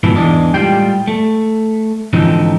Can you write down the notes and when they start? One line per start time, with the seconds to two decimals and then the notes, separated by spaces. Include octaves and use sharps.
0.03 G#2 B2 E3 F3 E4
0.16 E2 G#2 E3 G#3 D4
0.54 A2 G3 G#3 F4 G4 G5
1.08 A3
2.13 G#2 D3 E3 F3 C4 D#4